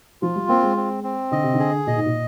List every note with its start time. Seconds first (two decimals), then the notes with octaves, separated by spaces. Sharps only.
0.22 F3 F4
0.36 G3
0.48 A#3 C4
0.63 G#3
0.77 C4
1.04 C4
1.31 D3 D#5
1.43 C3
1.54 D3
1.59 G#4
1.87 A#2 D#5
1.96 G#2
2.06 A#2